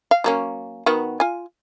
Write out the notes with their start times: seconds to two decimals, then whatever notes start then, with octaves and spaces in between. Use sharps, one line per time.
0.11 F5
0.24 F#3 A#3 C#4
0.86 D#3 B3 F#4
1.20 F4 G#5